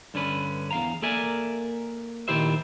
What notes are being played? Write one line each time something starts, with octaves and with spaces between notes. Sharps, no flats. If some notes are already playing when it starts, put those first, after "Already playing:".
G2 D3 C#4 B4
E2 F5 A#5
A#3 A4 A#4 D5 E5 G#5
A#2 D#3 E4 G4 C5 E5